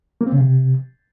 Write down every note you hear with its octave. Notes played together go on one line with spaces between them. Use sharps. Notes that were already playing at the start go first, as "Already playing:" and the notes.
A#3
C4
C#3
C3